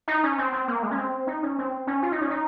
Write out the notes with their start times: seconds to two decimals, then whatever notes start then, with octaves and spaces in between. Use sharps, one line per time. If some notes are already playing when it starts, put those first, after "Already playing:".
0.08 D#4
0.23 C#4
0.38 C4
0.53 C4
0.68 A#3
0.83 G#3
0.91 C#4
0.97 C4
1.27 D#4
1.43 C#4
1.58 C4
1.87 C#4
2.03 F4
2.12 D#4
2.21 C#4
2.30 D#4